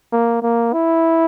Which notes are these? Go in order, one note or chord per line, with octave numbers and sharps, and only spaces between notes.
A#3
A#3
E4